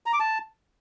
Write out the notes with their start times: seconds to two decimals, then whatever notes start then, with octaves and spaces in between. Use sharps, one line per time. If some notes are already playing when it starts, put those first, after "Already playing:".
0.06 A#5
0.13 D6
0.20 A5